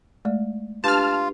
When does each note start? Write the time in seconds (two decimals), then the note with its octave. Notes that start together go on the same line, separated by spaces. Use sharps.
0.25 G#3 A3 D5
0.84 D4 F4 G4 B4 A5 F6